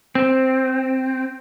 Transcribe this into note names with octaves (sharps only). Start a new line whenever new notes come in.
C4